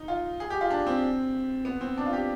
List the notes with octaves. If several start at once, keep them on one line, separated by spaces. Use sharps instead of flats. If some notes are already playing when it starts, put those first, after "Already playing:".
Already playing: D#4
F4
G#4
G4
F4
D4
C4
B3
C4
D4
F4
G4